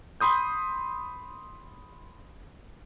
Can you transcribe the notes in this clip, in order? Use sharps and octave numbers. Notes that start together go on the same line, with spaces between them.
B5 C6 D#6 G6